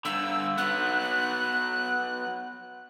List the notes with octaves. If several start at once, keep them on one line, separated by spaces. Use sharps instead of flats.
G2 D3 E6
F#3 B3 F#6